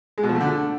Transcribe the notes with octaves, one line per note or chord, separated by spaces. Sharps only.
G#3
B2
F3
A3
D3